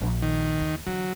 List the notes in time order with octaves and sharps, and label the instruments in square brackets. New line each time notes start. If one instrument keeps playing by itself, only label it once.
[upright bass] A#1
[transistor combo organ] D#3
[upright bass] D#2
[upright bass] E2 D3 [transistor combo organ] F#3